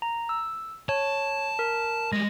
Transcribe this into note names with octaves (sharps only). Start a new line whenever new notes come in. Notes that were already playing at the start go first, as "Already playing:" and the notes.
A#5
E6
C#5 A5
A#4
G3 G#3 A#6